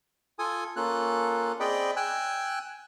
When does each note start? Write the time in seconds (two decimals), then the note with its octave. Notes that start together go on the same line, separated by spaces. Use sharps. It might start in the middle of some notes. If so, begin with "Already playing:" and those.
0.39 F4 A4 G#5 D#6
0.76 A#3 C#4 F4 A4 F#6
1.60 C4 G#4 D5 D#5 G5 B5
1.96 G5 G#5 E6 F#6